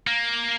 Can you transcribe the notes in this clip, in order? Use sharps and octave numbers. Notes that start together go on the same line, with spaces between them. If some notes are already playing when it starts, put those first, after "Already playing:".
A#3